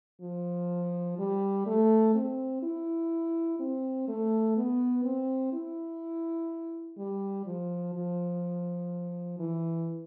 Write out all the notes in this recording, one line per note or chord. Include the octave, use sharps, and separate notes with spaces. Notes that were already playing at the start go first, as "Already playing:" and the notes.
F3
G3
A3
C4
E4
C4
A3
B3
C4
E4
G3
F3
F3
E3